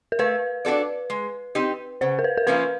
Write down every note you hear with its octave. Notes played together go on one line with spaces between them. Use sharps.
A#4
A3 B4
D4 F#4 A4 D5
G#3
C4 D#4 G4
C#3 C5
A#4
B4
A#4
F3 A#3 C#4 E4 B4